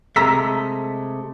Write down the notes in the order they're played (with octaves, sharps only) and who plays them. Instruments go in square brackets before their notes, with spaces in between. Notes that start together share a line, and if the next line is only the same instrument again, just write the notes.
[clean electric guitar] C3 G#3 A3 [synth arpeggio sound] A#5 E6 B6